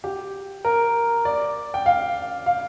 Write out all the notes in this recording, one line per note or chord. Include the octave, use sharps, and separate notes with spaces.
G4
A#4
D5
G5
F5
F5